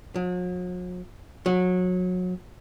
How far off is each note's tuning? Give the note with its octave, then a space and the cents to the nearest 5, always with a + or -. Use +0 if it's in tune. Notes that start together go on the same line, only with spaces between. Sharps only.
F#3 -45
F#3 -25